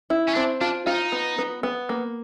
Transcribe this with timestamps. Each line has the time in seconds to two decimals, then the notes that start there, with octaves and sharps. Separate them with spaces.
0.10 E4
0.29 C#4
0.35 C4 D4
0.61 D4 F4
0.87 D#4 F4
1.12 B3
1.38 B3
1.63 B3
1.89 A#3